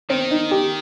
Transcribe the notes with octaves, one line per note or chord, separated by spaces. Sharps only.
D#3 C4
D#4
G4